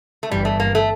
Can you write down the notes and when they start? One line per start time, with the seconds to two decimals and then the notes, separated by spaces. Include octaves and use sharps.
0.23 A3
0.31 G1 G2 E3 G3
0.45 A3
0.60 A#3
0.75 A3